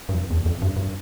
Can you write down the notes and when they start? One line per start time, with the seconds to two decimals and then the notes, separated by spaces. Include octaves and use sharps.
0.09 G2
0.14 F2
0.30 E2
0.46 F2
0.62 G2
0.76 G2